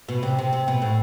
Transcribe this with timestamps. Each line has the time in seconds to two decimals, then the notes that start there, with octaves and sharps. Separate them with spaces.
0.08 B2
0.23 C3
0.38 C3
0.53 C3
0.68 B2
0.82 A2